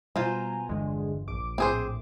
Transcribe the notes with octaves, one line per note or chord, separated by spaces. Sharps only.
B2 G3 F4 C5 G#5 A#5
G1 E2 D3 G#3
A#1 D6
A2 A3 C4 G#4 C5